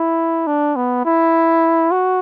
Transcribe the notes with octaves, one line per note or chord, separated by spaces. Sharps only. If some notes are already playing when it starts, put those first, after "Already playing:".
Already playing: E4
D4
B3
E4
F#4